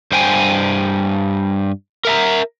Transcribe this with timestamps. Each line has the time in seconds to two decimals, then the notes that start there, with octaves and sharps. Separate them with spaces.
0.12 G2 C5 G5 G#5
2.05 A#4 E5 A#5